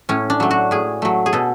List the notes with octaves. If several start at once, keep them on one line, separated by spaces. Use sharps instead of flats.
A2 C#4
D4
F#3 A3
F#4
A2 G#4
F#3 A3
G#4
B2 A4